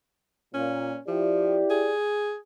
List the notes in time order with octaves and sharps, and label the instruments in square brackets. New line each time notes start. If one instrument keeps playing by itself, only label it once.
[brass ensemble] A#2 [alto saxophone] C#4
[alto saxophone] F3 [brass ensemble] E4 G4 D5
[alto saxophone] G#4